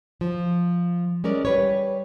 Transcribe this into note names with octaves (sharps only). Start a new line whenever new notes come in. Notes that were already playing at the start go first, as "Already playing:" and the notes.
F3
G#3 C#4 A#4 D5
G3 B4 C#5